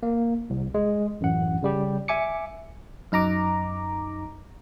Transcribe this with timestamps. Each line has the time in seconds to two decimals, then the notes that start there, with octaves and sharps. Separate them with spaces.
0.03 A#3
0.50 C2
0.74 G#3
1.21 A1 F#2 F#5
1.62 C#3 G3 G4
2.08 E5 G#5 D6 C#7
3.12 F#2 D#4 A#5 D6